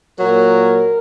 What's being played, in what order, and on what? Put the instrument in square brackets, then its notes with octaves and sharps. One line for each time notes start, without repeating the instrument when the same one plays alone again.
[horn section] A#2 F#3 A#4